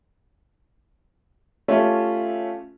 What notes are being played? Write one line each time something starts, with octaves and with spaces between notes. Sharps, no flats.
A3 C#4 F4 G4 E5